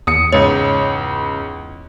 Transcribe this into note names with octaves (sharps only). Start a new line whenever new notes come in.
E2 D#6 C#7
C#2 G#2 C#5